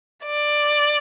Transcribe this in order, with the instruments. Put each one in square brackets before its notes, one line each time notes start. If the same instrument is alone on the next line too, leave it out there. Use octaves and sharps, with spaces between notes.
[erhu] D5